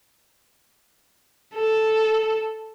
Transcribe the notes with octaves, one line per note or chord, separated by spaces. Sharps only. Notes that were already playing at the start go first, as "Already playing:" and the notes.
A4